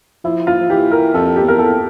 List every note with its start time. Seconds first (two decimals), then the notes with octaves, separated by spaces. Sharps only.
0.24 F3 E4
0.47 F4
0.61 F3
0.69 E3 G4
0.91 A#4
1.14 F2 A4
1.36 G4
1.43 E2 A#4
1.59 A4